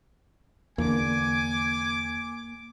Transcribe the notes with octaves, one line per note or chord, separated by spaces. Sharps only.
E2 D3 A#3 G#5 D6